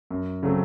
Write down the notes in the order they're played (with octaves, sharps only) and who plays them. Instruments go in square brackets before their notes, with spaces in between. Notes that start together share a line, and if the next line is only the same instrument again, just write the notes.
[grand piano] F#2
C#3 F#3 A3 C4